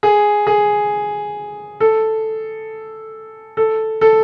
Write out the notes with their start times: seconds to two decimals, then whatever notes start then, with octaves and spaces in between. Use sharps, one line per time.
0.03 G#4
0.47 G#4
1.80 A4
3.57 A4
4.01 A4